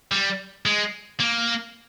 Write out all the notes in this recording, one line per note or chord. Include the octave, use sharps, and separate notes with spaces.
G3
G#3
A#3